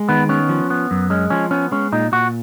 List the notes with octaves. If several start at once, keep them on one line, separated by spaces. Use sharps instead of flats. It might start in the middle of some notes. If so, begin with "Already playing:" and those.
Already playing: G#3
D#3 B3
B3 C#4
F3
B3
F#2
G#3 C#4
F3 C#4
B3 C#4
G#3 C#4
A#2 D#4
A#2 F#4